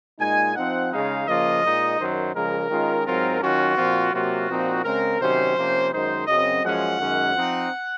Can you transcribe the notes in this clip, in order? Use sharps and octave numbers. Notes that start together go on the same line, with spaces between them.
A#2 G#3 D#4 G#5
F3 C4 D#4 F#5
C#3 G#3 D#4 F5
C#3 F3 A#3 F4 D#5
A#2 G#3 D#4
F#2 D#3 F#3 C5
C#3 F3 G#3 A#4
D#3 G#3 C#4 F4
G#2 F#3 C4 F4 A#4
D#3 F#3 C#4 F4 F#4
A#2 F3 C4 F4
C3 F#3 A#3 F4 F#4
A#2 F3 C4 D#4
C#3 G#3 C4 A#4
C3 D#3 F#3 C#4 C5
C3 F3 A#3 C#4
F#2 D#3 G#3 D#4 C5
F#2 C#3 F#3 C4 D#5
F#2 F3 G#3 C#4 F4 F#5
F#2 D#3 G#3 C#4
F3 C4 D#4